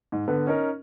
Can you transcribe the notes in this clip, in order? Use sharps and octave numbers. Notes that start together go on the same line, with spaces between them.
G#2
D3 B3 B4
C#4 D#4 A#4